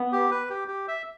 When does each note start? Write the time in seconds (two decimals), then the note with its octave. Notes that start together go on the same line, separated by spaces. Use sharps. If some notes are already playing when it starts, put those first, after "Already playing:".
Already playing: B3
0.12 G4
0.31 B4
0.50 G4
0.68 G4
0.88 E5